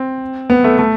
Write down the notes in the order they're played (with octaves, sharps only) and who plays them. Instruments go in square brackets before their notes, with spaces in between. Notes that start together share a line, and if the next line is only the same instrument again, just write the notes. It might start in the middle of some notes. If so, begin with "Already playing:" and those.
Already playing: [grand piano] C4
B3
A3
A3